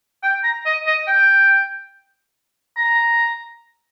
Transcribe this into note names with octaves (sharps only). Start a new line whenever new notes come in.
G5
A#5
D#5
D#5
G5
A#5